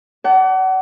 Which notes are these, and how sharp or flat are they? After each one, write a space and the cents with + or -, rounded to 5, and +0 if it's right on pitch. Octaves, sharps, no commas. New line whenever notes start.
D5 -25 F#5 +30 A5 +25